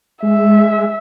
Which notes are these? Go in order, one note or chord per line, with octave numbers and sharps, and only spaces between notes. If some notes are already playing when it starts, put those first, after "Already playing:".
G#3 E5